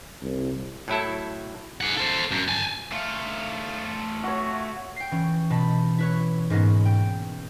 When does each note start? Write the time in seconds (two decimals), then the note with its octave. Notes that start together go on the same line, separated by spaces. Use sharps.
0.22 C2
0.88 A2 F#3 E4 A4
1.81 G#4 F#5
1.97 A4 C5
2.31 F#2
2.48 G#5 A5
2.92 A3 F4
4.23 F#4 C#5
4.96 G5 C7
5.11 E3 C#4
5.50 B2 A5 B5
5.98 E4 B4 C#5
6.50 G#2 A#3 B3 C#4
6.85 G5